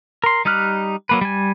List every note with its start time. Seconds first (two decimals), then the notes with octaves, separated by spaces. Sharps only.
0.24 A#4 C6
0.45 G3 D#4 G4 F6 F#6
1.09 F#3 A#3 B4
1.21 G3 G#5